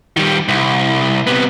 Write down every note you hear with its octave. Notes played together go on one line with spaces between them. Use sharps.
D#3 G3
C2
C3 B3